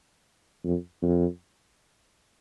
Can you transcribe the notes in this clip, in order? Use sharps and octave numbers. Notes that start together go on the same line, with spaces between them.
F2
F2